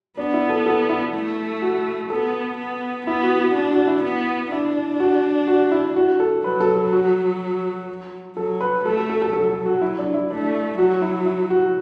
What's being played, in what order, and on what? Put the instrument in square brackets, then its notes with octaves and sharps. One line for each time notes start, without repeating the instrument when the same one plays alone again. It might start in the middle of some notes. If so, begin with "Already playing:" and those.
[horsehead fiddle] B3 [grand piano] D4
[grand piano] E4
A4
A4
E4
[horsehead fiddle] A3
[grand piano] F#4
[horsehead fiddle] B3 [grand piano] A4
[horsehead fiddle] B3
[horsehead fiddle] B3 [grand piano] E4
[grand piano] F#4
F#4
[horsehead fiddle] D4
[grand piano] F#4
E4
[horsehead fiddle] B3
[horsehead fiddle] D4 [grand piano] E4
[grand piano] F#4
F#4
E4
F#4
A4
[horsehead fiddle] F#3 [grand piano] B4
[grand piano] A4
A4
F#4
[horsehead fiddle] F#3 [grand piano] A4
[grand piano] B4
[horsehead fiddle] A3 [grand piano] A4
[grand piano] A4
A4
A4
[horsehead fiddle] F#3 [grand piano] A4
[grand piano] A4
F#4
E4
D4
E4
[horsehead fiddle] A3 [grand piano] D4
[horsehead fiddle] F#3 [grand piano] F#4
[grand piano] E4
E4
F#4